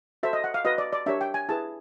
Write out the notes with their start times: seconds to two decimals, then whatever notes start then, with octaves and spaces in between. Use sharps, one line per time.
0.23 F#4 A4 C5 E5
0.33 D#5
0.44 F#5
0.54 F5
0.65 F#4 B4 D#5
0.78 D5
0.93 D5
1.06 D4 G4 A#4 C#5 E5
1.21 G5
1.34 G#5
1.49 E4 G#4 B4 A5